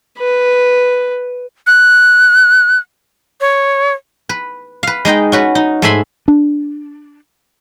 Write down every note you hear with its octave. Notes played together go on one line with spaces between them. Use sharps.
B4
F#6
C#5
B4
B4 F5
G#3 D#4 D#5 G5
C#4 F#4 B4
D#4
G#2 A3 E5 G#5 B5 C6
D4